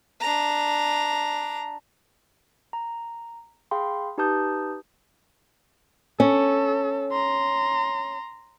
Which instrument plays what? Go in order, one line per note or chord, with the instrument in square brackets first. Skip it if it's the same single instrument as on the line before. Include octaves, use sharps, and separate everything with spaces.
[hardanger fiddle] D4 A#5
[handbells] A#5
G#4 F5 G5 B5 C6
D#4 G4 B4 A5 D#6 G6
[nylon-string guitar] C#4 [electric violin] A4
[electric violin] A#5 C6